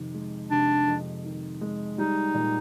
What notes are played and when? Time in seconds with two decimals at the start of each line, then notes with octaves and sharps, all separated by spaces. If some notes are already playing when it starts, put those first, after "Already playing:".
Already playing: F2 C3 D#3
0.14 G#3
0.51 C3 D4
0.88 F2
1.24 D#3
1.61 G#3
1.98 G3 D#4
2.34 A#2